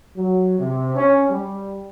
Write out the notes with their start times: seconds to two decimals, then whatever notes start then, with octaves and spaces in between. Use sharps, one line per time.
0.16 F#3
0.58 C3
0.95 C#4
1.28 G3